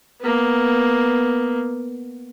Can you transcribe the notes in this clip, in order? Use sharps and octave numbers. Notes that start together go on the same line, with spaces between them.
A#3 B3